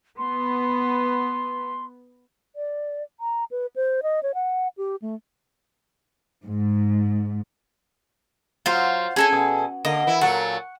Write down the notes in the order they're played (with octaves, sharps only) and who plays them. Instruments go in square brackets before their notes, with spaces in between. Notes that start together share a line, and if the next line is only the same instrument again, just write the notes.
[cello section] B3 [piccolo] C6
[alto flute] D5
A#5
B4
C5
D#5
C#5
F#5
G4
A3
[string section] G#2
[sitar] F#3 [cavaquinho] F4 C5 F5
[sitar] C#4 [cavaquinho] G#4 A4 G#5
[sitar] B2
[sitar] D3 A#3 [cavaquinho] D#5
[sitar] E3 E4
[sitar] A#2 F#3 A4 [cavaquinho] F#5 C#6